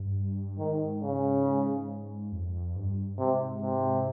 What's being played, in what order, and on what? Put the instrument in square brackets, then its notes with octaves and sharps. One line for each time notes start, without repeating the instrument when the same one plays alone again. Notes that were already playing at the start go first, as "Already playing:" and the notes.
Already playing: [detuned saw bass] G2
[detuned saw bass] G#2 [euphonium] D#3
[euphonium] C#3
[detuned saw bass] F2
G2
[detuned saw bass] G#2 [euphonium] C3
[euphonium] C3